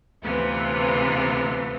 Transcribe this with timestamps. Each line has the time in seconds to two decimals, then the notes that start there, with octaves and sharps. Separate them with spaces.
0.23 D2 C3 E3 B3 F4